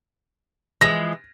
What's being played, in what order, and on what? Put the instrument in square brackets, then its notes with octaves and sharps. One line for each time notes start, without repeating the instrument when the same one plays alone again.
[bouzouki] E3 F3 G#3 [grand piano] A#6